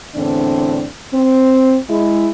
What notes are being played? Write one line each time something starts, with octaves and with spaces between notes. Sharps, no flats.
E2 A2 D3 C4 D4
C4
G#3 E4